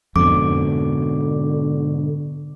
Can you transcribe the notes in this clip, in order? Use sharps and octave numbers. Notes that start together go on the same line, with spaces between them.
F2 G#2 B2 D3 D6